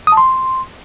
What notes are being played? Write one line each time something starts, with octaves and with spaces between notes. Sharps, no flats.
D#6
A5
C6